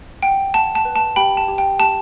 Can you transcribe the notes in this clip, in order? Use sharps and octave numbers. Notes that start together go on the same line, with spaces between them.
F#5 G5
F#5 A5
A5
B4
A5
G4 G5 B5
A5
G4
G5
G4 A5